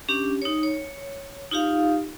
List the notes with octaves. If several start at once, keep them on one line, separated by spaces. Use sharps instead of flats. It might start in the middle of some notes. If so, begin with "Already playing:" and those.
C#4 D4 G4
D#4 C#5
C#5
D#4 F4 G4 F5